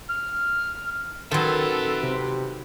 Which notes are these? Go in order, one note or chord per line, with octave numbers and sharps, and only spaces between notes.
F6
D#3 F#3 A4 B4 E5 C6
C3